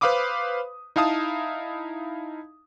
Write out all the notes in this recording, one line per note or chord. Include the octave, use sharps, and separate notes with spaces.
B4 C5 F5 B5 D6 D#6
D#4 E4 F5 A5 D#6